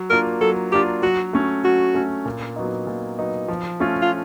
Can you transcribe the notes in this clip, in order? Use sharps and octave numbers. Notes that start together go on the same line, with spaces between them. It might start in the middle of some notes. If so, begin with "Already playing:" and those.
Already playing: F#3
A#3 D4 F4 A#4
F#3 A4
A#3 D4 F4 G4
F#3 F#4
A3 C#4
F#3 F#4
A3 C#4
A#2
F#3 B3 D#4
A#2
F#3 B3 D#4
F3
A3 C#4 F4
F4